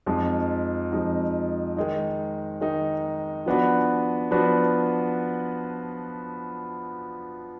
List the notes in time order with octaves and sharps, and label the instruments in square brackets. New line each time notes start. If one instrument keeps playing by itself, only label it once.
[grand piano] F2 F3 G#3 D#4
F2 F3 G#3 D#4
D#3 G#3 D#4
D#3 G#3 D#4
F3 B3 D4 F#4 B4
F3 B3 D4 F#4 B4